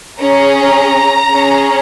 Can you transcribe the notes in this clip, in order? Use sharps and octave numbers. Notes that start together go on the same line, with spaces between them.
C#4 G#4 A#5
C#4 G#4